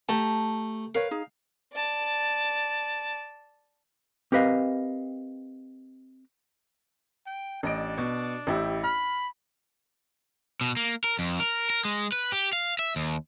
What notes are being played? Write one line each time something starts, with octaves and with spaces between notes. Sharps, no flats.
A3 G4 A5 A#5
A#4 B4 C#5 F5
D#4 G#4
D5 A5
C4 G4 A#4 B4 D#5 F5
G5
A1 D4 D#5 D7
B2
A1 E4 G4
B5 F6
B2
A#3
A#4
F2
A#4
A#4
G#3
B4
G4
F5
E5
D#2